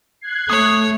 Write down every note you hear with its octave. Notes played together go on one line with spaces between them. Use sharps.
F#6 G#6 C7
A3 C#5 D#6